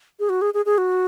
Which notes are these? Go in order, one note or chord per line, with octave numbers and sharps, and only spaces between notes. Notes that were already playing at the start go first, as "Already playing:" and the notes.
G#4
F#4
G#4
G#4
G#4
F#4